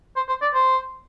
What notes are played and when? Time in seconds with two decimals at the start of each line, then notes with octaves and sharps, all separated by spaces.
0.16 C5
0.28 C5
0.42 D5
0.54 C5